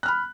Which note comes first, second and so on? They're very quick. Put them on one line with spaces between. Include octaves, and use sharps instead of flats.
F#6 F6 B5